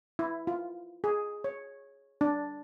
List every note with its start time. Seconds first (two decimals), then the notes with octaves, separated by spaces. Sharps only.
0.19 E4
0.47 F4
1.04 G#4
1.44 C#5
2.21 D4